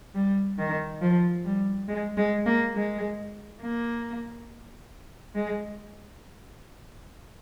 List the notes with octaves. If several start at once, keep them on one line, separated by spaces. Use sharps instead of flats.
G3
D#3
F3
G3
G#3
G#3
A#3
G#3
A#3
G#3